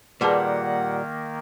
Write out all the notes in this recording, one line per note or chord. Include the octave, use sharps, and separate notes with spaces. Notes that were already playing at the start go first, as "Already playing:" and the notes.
A#2 D#3 G3 A#3 G#4 B4 F#5 A5